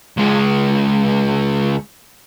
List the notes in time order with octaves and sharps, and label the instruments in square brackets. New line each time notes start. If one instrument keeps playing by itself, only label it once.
[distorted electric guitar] C#2 G#3